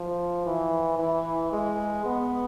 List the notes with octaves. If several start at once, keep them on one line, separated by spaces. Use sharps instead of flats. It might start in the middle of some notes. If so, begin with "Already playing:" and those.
Already playing: F3
E3
E3
G#3
B3